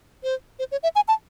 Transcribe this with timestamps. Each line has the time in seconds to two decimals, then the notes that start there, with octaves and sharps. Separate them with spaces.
0.23 C5
0.59 C5
0.72 C#5
0.83 E5
0.95 G#5
1.08 A5